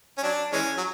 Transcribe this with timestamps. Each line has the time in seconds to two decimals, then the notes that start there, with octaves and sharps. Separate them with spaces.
0.18 C#4
0.23 F#3 D4
0.53 E3 G#3 C#4
0.77 F#3